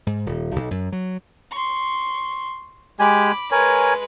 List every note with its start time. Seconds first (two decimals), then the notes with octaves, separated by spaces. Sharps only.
0.07 G#2
0.26 D#1
0.56 B1
0.71 F#2
0.92 F#3
1.51 C6 C#6
2.99 G#3 G4 G#5 B5 D6
3.52 G#3 A#4 B4 C#5 G#5